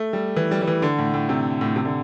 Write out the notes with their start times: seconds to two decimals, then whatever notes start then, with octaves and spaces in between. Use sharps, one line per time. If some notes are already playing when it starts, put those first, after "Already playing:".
Already playing: A3
0.13 G3
0.36 E3
0.51 G3
0.62 G3
0.67 E3
0.82 D3
0.98 A2
1.14 A2
1.29 C3
1.61 A2
1.76 C3
1.85 D3